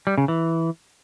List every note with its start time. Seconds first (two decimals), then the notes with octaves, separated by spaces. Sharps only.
0.07 G3
0.18 C#3
0.28 E3